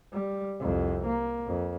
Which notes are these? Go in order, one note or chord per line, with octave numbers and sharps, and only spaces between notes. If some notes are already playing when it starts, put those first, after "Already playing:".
G3
C2 F2
A#3
F2